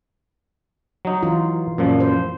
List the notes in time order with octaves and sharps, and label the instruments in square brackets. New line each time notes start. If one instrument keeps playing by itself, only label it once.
[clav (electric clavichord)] F#3 D#4
[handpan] E3 F4
[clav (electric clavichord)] F#2 A#2 F3
[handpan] C5